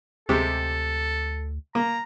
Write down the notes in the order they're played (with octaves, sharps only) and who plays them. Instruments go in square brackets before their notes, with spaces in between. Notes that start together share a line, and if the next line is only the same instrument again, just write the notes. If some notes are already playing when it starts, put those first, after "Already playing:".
[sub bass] D2 [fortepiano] C3 G#3 G4 [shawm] A4
[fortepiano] A#3 [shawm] A#5